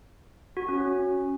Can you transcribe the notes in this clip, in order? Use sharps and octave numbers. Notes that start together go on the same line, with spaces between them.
F#4
C#4
C#4